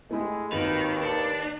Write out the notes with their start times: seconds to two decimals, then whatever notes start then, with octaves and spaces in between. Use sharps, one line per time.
0.11 G#3 A3 E4 G4
0.52 G#1 D#2 D#3 D#4 B4
1.02 D4 A#4 C#7